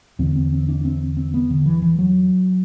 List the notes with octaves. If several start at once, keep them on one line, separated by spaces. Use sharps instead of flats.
E2 D3 C4
C4
C4
D4
C4
C4
B3
D3
E3
E3
F#3